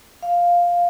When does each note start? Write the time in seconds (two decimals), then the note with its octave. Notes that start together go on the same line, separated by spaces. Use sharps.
0.23 F5